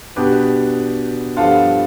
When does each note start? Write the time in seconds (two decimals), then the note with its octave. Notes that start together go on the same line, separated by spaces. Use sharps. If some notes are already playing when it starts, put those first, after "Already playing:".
0.16 B2 G3 B3 D4 G4 B4
1.37 G2 F3 B3 D4 F4 A4